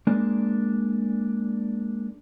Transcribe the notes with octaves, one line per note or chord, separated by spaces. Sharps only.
G#3 A#3 D4